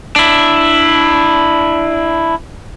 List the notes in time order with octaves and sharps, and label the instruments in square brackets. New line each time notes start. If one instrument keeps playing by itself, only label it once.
[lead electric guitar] D4 E4